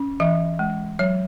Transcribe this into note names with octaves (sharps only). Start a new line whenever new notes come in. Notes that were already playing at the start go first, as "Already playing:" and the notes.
Already playing: C#4
E3 E5
G#3
F#3 C#5